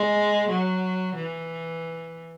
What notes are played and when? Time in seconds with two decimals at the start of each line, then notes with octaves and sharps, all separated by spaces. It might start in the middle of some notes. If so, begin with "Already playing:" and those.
Already playing: G#3
0.50 F#3
1.16 E3